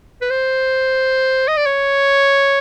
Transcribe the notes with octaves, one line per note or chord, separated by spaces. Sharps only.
B4
C5
D#5
D5
C#5